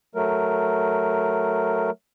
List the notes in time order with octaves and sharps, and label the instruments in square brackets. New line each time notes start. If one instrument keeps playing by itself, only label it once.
[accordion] F#3 A3 A#4